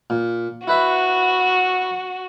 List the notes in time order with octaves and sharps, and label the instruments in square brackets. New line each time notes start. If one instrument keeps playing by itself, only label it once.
[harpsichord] A#2
[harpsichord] E4 B4 E5 [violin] F#4